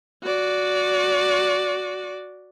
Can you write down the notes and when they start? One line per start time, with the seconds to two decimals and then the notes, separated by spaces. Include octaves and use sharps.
0.23 F#4 D5